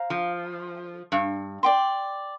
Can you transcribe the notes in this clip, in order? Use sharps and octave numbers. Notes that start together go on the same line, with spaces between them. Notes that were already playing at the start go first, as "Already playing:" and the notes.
Already playing: C5 F5 A#5
F3
G2
D5 G5 C6